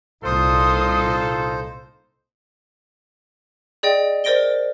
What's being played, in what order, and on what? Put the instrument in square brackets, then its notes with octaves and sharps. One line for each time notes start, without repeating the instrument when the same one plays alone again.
[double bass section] C2 A#2 [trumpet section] D#4 F4 A4 [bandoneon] C5 [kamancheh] C6 D#6
[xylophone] G#4 D5 D#5 G5
A#4 C5 D5 A#6 D7 G7